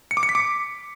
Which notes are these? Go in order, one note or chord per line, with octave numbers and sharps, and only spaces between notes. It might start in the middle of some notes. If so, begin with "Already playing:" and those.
C#7
D6
C#7
B6
D6